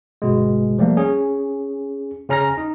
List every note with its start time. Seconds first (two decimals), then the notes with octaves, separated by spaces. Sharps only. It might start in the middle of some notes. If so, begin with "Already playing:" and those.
0.22 G1 B2 G#3
0.79 F3 G3 A3 A#3
0.97 C#4 G#4
2.29 C#3 C#4 A#5 F6 A#6
2.58 D#4